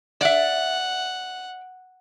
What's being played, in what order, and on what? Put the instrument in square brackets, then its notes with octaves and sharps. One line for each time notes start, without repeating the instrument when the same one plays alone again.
[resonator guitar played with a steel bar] D5 E5 [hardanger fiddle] F#5